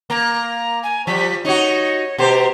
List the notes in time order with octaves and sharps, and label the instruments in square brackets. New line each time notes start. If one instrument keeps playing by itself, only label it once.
[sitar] A#3 [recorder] A#5
[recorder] G#5
[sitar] F3 G3 [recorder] B6
[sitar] D#4 F#4 [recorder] C#5
[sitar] B2 G4 C5 [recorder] A#5